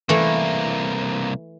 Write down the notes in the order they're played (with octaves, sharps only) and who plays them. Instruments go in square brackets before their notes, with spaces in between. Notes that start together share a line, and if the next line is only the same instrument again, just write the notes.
[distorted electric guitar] C2 A#3 [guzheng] E3 A3